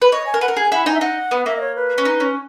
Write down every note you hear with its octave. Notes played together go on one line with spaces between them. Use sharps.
B4
C#5 D#5
G#5
A#4
B4 F#5
A#4
G#4 G#5
E4 F#5
D#4 G#5
E5
D#4 F#5
B3
A#3 E5
D#5
C#5
B4
C#4
D#4
C#4